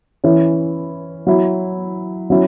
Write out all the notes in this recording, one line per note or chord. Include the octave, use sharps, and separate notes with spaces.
E3 C#4 E4
F#3 E4
F#3 C#4 E4